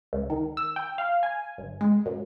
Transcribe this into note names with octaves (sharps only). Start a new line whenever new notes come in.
C#2
D#3
E6
G5
F5
G#5
G1
G#3
F#2